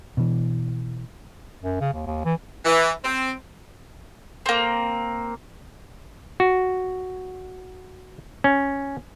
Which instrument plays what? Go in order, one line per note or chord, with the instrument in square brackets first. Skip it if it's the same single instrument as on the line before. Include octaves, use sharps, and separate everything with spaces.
[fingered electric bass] B2 E3
[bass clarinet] F#2
C#3
D#2
D#2
E3
[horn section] E3
C4
[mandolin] A#3 C4
[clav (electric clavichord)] F#4
C#4